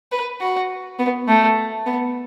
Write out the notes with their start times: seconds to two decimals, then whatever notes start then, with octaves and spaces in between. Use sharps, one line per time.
0.12 B4
0.41 F#4
0.99 B3
1.28 A3
1.86 B3